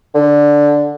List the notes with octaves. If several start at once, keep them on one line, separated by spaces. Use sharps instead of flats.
D3